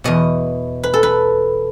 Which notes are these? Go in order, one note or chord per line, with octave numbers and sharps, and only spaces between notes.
E2 B2 D#5
B4
A4
B4